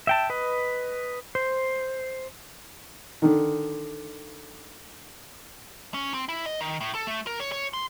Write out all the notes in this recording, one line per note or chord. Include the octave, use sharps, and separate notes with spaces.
E5 G5 A5
B4 D#5
C5
D3 D#3
C#4
C4
E4
D#5
D#3
A2
A4
A3
A#4
C#5
C#5
C6